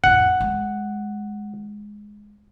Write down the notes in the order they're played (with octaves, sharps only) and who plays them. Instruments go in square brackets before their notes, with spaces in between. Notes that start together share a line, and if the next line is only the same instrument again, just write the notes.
[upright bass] F2 A2 [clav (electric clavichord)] F#5
[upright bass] G#3